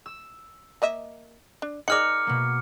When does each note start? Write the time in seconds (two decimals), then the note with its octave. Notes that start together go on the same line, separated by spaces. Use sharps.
0.06 E6
0.82 A#3 D#5 E5
1.62 D4
1.88 D#4 G#4 A#4 D5 F#5 D6 F6 C#7
2.27 B2 A#3